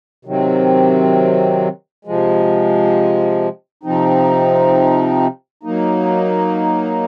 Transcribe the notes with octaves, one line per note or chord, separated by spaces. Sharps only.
C3 D#3 F#3 C4
C3 F3 G#3
C3 F3 C4 D#4
F#3 A#3 D#4